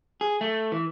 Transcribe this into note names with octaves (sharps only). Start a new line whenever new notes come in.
G#4
A3
E3